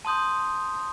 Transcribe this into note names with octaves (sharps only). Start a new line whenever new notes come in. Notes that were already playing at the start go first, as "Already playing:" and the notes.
A5 C6 D#6 G6